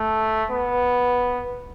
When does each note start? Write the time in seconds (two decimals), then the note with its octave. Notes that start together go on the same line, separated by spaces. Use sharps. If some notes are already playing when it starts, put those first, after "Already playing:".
Already playing: A3
0.50 B3